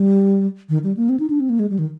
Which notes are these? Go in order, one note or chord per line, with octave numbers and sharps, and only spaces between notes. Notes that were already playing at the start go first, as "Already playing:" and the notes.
Already playing: G3
D#3
G3
A#3
C4
D#4
D4
C4
A#3
G#3
G3
D#3